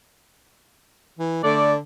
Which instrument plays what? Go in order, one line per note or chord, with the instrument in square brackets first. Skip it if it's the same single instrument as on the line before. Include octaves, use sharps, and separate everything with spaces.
[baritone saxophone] E3
[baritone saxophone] D3 [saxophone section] A3 D5